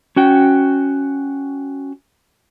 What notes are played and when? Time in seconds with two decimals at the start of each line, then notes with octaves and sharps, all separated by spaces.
0.16 C#4 F#4 G5